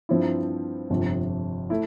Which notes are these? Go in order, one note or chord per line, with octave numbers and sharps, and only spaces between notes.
G2 F3 C4 E4
G1 F2 C3
A3 E4